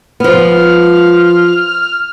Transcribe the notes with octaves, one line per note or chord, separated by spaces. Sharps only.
F3 B3 F6